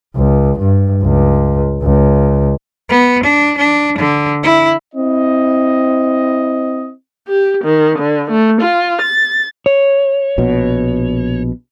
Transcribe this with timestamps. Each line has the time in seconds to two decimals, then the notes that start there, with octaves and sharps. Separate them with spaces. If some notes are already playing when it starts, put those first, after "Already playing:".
0.16 C#2
0.59 G2
1.03 C#2
1.83 C#2
2.90 B3
3.24 D4
3.58 D4
3.98 D3
4.43 E4
4.95 C4 E4 D#5
7.28 G4
7.64 D#3
7.98 D3
8.31 A3
8.61 F4
9.02 A6
9.66 C#5
10.38 A#1 B2